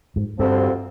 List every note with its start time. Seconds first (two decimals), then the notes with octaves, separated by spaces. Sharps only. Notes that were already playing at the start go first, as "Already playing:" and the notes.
0.16 G#2
0.39 D2 G2 D3 F3 C4